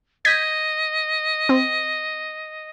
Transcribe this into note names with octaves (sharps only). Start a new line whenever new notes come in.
D#5 G6 G#6 B6
C4